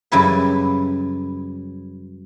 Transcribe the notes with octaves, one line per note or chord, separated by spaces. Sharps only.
F#2 C#3 G3 E4 B4